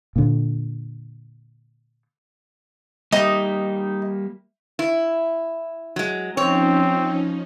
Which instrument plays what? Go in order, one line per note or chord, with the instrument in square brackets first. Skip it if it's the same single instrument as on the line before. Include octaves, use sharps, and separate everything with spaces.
[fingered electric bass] A#2 D3
[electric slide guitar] G3 A#3 G4 [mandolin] D#4
[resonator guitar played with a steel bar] E4
F#3 G#3
[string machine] F3 C#4 D#4 [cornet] C4 [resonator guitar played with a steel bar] C#5